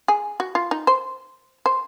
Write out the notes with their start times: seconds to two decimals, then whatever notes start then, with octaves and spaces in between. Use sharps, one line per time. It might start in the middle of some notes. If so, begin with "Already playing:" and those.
0.08 G#4
0.40 F#4
0.55 F4
0.71 D#4
0.87 C5
1.66 C5